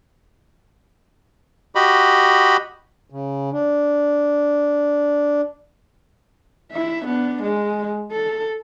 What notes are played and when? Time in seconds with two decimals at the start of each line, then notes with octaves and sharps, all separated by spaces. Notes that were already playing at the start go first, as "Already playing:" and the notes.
1.75 F#4 G4 D#5 B5
3.10 C#3
3.52 D4
6.72 E4 E5
7.05 B3 D4
7.42 G#3
8.12 A4